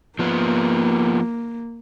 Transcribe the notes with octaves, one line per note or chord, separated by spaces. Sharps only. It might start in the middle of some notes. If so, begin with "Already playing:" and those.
F3 A#3 B3